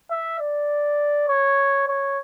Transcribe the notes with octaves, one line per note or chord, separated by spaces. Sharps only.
E5
D5
C#5
C#5